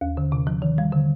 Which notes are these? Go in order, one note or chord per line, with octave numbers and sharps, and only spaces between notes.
D#2
D3
C3
F3
D#3
G3
D3